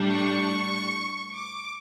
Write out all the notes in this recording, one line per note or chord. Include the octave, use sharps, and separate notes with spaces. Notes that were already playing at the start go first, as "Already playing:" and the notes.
Already playing: A2 G3 D4
C#6
D6